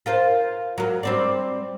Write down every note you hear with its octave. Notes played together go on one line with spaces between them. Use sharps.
F4 A#4 C5
F#3 A#4
G3 C4 D5